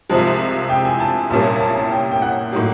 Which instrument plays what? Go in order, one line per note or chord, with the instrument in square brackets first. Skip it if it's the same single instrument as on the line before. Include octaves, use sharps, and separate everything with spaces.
[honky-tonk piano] C2 C3 F3 G#3 [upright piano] A5
[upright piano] G5
G#5
A5
[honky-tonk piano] C2 A#2 G3 A#3 C#4 [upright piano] A5
[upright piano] A5
A5
G5
G5
F#5
[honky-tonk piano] A2 F#3 A#3 D#4 G4